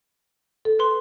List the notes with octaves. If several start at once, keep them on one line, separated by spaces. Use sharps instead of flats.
A4
B4 C6